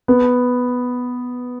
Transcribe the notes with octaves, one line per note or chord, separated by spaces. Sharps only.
B3